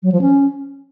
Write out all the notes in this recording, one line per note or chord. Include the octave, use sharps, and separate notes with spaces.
F#3
F3
C#4